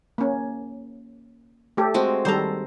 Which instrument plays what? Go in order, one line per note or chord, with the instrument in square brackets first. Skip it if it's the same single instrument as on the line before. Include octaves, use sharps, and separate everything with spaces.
[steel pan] A#3 C#4
A3 G4 A4
[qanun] G#3 C4 F#4
[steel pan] D#3 G3 A4 [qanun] C5 A#5